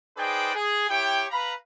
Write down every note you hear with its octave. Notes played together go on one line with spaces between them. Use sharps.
D#4 G#4 B4 C5 D5 G5
G#4
E4 G4 C#5 G5
B4 F5 A#5 B5